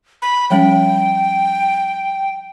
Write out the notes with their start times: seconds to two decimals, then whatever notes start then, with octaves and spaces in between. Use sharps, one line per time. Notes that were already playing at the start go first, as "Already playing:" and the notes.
0.22 B5
0.50 F3 G3 C#4 G5